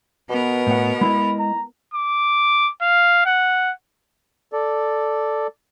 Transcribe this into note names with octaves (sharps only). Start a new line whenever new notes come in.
B2 B3 A#4
A2 F#5
G#3 E4 D#5 B5
A#5
D6
F5
F#5
A4 D5